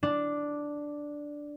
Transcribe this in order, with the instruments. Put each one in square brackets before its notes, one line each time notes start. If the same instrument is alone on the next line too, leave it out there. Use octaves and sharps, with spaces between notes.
[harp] D4